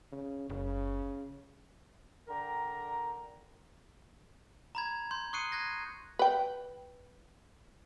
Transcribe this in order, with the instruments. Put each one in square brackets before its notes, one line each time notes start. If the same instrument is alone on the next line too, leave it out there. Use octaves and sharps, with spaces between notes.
[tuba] C#3
[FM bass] F#1 [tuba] C#3
[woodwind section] D3 A#4 G5 A#5
[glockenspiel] A#5 B5 G#6
C6 G6
C#6 D#6 F#6 C7 C#7 D#7
F#6 G#6 A#6
[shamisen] B4 G5